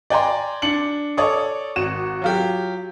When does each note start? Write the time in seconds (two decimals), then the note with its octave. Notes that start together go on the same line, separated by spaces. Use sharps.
0.10 D5 G5 G#5 A#5 C6
0.62 D4 C#7 F#7
1.17 A4 C#5 D5 C#6 D#6
1.76 G#1 F#4 E7
2.22 F#3 F4 G4